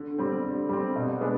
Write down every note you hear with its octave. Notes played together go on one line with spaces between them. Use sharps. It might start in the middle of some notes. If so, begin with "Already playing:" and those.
Already playing: D3
G3 C4
D3
G3 C4
B2
G#3 B3 D4